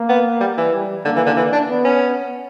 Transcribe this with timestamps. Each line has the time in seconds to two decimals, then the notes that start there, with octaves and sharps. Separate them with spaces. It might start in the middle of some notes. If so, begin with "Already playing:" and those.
Already playing: A#3
0.09 B3
0.40 G3
0.57 E3
0.73 G3
1.05 D3 A#3
1.16 E3
1.26 D3
1.37 E3
1.53 D4
1.70 B3
1.85 C#4